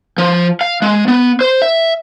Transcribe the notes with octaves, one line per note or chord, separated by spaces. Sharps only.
F3
F5
G#3
B3
C5
E5